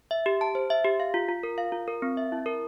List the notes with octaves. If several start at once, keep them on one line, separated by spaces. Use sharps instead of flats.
E5
G4
A5
C5
E5
G4
F5
F4
F4
A#4
F5
F4
A#4
C4
E5
E4
A#4